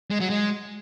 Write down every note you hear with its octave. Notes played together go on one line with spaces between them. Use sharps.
G#3
F#3
G#3